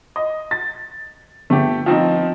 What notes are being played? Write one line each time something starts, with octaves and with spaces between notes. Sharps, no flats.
D#5
A6
G1 A3 G4
F3 C4 D#4